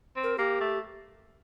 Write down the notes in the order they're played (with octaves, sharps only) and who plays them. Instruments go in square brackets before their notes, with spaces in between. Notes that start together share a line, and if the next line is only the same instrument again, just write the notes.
[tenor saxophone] C4
[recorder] A#4
[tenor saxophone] A#3 [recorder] G4
[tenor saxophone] A3